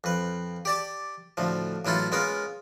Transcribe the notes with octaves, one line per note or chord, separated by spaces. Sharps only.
F2 B4
G4 D5 A5
D2 A2 F3
A1 F#3 E4 F4 A4
G#3 B3 C#4 F4 A#4